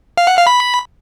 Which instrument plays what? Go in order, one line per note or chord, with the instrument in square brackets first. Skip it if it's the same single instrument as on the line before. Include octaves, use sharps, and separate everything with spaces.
[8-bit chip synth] F5
F#5
F5
B5